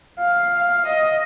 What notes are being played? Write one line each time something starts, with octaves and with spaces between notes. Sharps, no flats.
F5
D#5